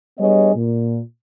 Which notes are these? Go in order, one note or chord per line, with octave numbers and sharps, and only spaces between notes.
G3 B3 D4 G#4 C#5 D#5
A#2